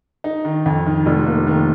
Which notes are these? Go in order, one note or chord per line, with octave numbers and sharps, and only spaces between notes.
D#4
D#3
F2
D#3
F1
A#3
D#3